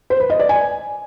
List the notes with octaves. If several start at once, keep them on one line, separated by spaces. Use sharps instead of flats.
C5
B4
D#5
D5
G#5